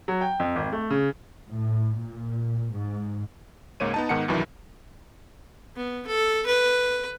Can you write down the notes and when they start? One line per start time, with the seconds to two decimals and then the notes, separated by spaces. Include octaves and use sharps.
0.08 F#3
0.21 G5
0.40 F2
0.56 G#1
0.72 A3
0.90 C#3
1.49 A2
2.00 A#2
2.73 G#2
3.80 C#2 G#2 A#3 C#5 D#7
3.94 B3 D#4 A5
4.09 G#2 D#3 B3 F#5 C#7
4.28 C2 G2 D#3 E3 F#3
5.76 B3
6.07 A4
6.47 B4